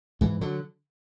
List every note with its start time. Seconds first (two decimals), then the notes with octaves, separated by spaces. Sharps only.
0.21 G#2 E3
0.41 D3 F#3